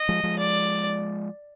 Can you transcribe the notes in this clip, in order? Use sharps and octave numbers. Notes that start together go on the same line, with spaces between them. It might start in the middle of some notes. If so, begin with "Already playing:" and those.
Already playing: D#5
F3 G#3
F3 G#3
D5